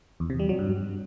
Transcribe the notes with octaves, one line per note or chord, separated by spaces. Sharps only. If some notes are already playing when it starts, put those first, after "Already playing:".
E2
C3
G3
F#3
G2